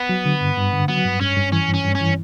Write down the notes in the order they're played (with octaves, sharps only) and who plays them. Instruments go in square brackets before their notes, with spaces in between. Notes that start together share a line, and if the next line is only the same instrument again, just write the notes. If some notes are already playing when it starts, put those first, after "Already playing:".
Already playing: [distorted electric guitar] B3
[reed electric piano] F#3
D3
G2
G2
D3
[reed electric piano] F#3 [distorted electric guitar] B3
[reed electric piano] G2
[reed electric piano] G2 [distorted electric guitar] C#4
[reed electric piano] G2
[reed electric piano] E3 [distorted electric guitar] C#4
[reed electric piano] G2 [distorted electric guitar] C#4
[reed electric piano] G2
[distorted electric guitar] C#4
[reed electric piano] E3